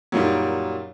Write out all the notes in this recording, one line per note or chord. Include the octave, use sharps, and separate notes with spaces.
F#2 A#2 G3 D#4